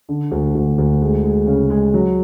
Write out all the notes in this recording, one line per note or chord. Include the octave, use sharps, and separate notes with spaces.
D3
D2
D2
D2
G#3
G#3
C#3
G#3
F#3